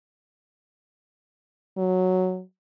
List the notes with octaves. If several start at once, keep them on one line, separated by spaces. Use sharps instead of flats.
F#3